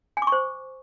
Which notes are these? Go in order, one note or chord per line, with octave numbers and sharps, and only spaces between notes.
G#5
D6
C#6
C5